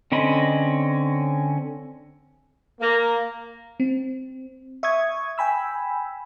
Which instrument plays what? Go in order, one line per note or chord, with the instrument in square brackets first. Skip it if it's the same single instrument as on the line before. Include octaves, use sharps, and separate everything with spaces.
[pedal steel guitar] D3 C4 C#4 D#5 B5
[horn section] A#3
[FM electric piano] C4
E5 C#6 D#6 G#6
G5 G#5 B5 E6